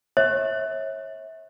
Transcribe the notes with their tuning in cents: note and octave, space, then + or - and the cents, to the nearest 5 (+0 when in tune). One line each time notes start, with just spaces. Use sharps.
C#5 -30 E5 -30